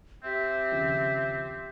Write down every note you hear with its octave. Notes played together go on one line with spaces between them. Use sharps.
C4 G4 E5
D#2 C#3 F3